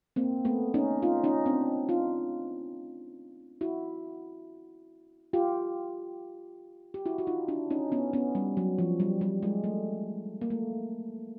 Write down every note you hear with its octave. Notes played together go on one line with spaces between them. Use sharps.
A#3 C4
A3 B3
C#4 D#4
D#4 F4
C#4 D#4
C4 D4
D#4 F4
E4 F#4
F4 G4
G4
E4 F#4
F#4
D#4 F4
D4 E4
C#4 D#4
B3 C#4
B3 C#4
G3
F#3
F3
G3
G3
G#3
A3
A#3
A3